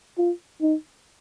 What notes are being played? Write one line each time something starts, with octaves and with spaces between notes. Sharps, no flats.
F4
D#4